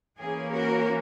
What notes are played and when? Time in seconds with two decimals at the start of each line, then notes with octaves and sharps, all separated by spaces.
0.19 E3 A#3 C#4 G#4
0.52 F#4 A#4